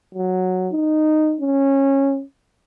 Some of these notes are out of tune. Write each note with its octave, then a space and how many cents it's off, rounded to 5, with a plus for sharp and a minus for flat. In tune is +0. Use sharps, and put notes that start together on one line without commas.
F#3 -5
D#4 -10
C#4 -15